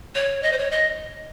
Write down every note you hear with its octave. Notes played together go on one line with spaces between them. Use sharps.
C#5
D#5
C5
C#5
D#5